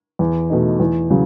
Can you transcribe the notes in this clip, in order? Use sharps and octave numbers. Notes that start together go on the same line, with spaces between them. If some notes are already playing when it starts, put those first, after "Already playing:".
E2
B2 A3 D#4
E2
C#3 F#3